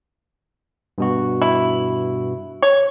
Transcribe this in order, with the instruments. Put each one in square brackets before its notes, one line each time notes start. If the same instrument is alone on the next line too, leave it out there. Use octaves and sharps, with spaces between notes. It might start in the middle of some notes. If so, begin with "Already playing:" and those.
[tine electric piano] G2 B2 F#4
[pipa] E4
C#5